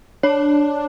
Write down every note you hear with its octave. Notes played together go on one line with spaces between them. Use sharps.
D4 C#5